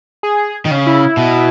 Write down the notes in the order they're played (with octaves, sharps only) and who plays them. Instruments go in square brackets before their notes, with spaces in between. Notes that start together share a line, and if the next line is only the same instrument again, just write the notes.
[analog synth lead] G#4
[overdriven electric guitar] D#3
C#3
[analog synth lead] E4
[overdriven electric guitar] B2